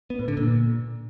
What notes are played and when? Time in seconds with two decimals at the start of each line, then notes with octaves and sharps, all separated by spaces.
0.10 B3
0.19 A2
0.28 D3
0.37 A#2